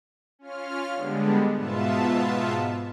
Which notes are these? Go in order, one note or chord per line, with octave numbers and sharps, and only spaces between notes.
C#4 F4 F6
D3 G3 G#3 B3 D4
G#2 B2 B3 F4 E5 A5